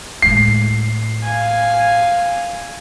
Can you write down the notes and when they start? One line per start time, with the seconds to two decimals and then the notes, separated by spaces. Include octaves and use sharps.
0.22 A2 G#3 C7
1.24 F5 G#5